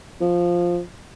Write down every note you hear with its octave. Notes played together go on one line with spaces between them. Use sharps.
F3